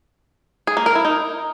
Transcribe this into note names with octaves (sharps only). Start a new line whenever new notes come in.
G#4
A#3
A#4
E4
D#4